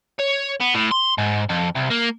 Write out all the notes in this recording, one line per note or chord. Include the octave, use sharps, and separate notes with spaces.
C#5
B3
A2
C6
G#2
F2
C2
A#3